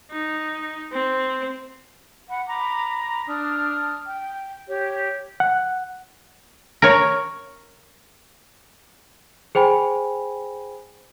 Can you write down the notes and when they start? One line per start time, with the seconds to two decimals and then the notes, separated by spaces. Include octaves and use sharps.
0.12 D#4
0.92 C4
2.29 F#5 B5
2.48 A#5 B5 D6
3.28 D4 D#6 F6
4.06 G5
4.68 G4 C#5
5.40 F#5
6.82 A#4 C#5
9.55 G#4 C5 G5 G#5 B5